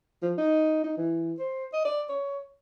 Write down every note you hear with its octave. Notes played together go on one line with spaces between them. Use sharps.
F3
D#4
D#4
E3
C5
D#5
D5
C#5